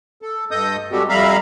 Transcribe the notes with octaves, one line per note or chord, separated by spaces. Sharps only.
A4
G2 A4 D#5 D#6 G6
G3 G#3 C4 F#4 G4 A4
F2 G3 E5 F5 A#5 B5